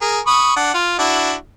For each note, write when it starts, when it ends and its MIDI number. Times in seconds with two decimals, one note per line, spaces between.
0.02 0.20 68
0.02 0.20 70
0.27 0.54 83
0.27 0.54 85
0.27 0.54 87
0.56 0.72 62
0.56 0.72 78
0.74 0.94 65
0.99 1.34 62
0.99 1.34 64
0.99 1.34 66